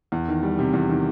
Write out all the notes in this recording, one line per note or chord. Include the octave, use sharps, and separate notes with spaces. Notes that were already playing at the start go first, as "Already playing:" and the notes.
E2
D#3
G3
C3
E2
D#3